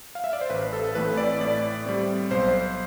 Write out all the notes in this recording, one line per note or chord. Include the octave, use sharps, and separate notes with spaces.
F5
E5
D5
C5
A1 B4
A4
A2 E3 A3 C4 B4
D5
A2 D5
G3 C4
B1 C5